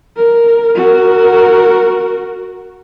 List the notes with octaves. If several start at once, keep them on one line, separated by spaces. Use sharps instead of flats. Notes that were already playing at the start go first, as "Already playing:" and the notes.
A#4
F#4 A#4